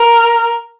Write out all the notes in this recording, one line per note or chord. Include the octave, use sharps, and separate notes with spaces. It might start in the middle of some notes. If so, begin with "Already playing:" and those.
Already playing: A#4